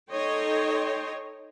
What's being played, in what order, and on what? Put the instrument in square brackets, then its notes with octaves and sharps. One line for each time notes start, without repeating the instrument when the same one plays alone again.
[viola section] D#4 A4 C#5 D#5 G5 C6